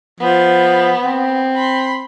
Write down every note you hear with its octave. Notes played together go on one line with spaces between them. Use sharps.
F3 B3
C4
B5 C6